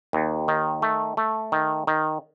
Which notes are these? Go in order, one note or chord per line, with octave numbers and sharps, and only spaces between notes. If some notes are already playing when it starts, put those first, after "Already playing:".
D#2
D#3
A3
A3
D#3
D#3